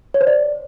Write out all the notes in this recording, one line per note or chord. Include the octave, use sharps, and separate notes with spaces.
C#5
C5
D5